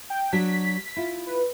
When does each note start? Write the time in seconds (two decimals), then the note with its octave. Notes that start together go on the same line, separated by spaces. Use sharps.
0.10 G5
0.33 F#3 D4 F#4 B6
0.96 E4 F4
1.27 B4